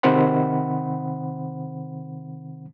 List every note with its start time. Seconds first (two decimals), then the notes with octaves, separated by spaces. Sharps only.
0.03 C3 D#3 C4 C5 F#5 B5